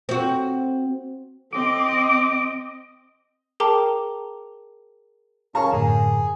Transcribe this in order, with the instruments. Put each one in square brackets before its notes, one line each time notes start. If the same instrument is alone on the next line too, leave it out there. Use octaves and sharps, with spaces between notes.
[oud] C4 F#4
[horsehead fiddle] C4 D#5 [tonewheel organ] D6
[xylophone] G#4 A#4 G5 A5 A#5 D6
[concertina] C#4 A5 [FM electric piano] G#4 F5 C#6 [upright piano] A#4 A#5
[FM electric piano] F#2 A2 D3 [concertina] G#4